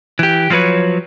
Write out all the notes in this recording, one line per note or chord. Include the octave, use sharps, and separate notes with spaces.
E3 G4
F3 F#3 G#3 B4 C#5